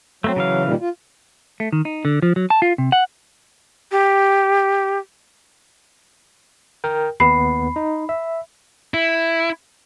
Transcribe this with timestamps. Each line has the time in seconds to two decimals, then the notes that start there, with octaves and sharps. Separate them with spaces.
0.24 F#3 A3 A#3 C4
0.36 C#3 E3 F5
0.65 A#2 D#3 G3
0.81 F4
1.60 A3
1.73 D#3
1.85 D#4
2.05 D3
2.22 F3
2.36 F#3
2.50 A5
2.62 F4
2.78 C3
2.92 F#5
3.92 G4
6.84 A#4 G5
7.20 D#2 B3 B5 C7
7.76 D#4
8.09 E5
8.94 E4